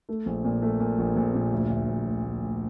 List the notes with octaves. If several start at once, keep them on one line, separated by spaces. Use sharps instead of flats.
A3
A#1
A#2
A3
A#2
A#1
A#1
A#2
D2
D2
D2
D2
D2
D2